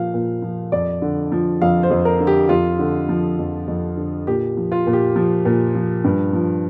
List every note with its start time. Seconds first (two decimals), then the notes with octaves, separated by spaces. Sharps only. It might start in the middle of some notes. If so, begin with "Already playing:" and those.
Already playing: A#2 F3 F5
0.14 A#2
0.42 F3
0.72 F2 D5
1.02 D3
1.32 F3
1.62 F2 F5
1.83 C5
1.91 F2
2.05 A#4
2.20 D3
2.27 G4
2.49 F2 F4
2.79 D3
3.09 F3
3.39 F2
3.68 F2
3.97 D3
4.27 A#2 G4
4.57 F3
4.72 F4
4.87 A#2
4.93 G4
5.16 F3
5.45 A#2
5.75 F3
6.04 G2
6.33 F3